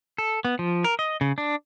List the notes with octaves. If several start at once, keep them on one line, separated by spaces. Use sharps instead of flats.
A4
B3
F3
A#4
D#5
C#3
D4